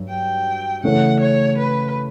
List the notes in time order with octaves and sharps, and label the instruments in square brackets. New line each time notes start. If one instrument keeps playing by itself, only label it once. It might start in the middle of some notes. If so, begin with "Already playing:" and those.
Already playing: [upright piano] G2 F#3
[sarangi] G5
[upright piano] C#3 E3 A3 C#4 [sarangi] F#5
[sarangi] C#5
B4